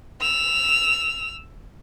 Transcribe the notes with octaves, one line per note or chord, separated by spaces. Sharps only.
E6 F7